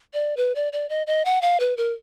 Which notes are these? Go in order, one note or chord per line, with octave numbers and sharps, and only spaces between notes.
D5
B4
D5
D5
D#5
D#5
F#5
F5
B4
A#4